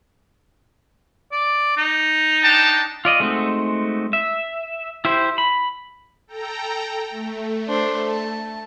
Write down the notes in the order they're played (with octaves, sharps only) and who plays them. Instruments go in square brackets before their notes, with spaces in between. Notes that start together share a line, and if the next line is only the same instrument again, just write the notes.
[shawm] D5
D#4
[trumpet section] D4 G5 A5
[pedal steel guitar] F4 D5 D#5
G#3 A3 C4 D#4 F#4
E5
E4 G4 C5
B5
[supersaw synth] A4 G5 A#5
A3
[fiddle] D4 C5
A5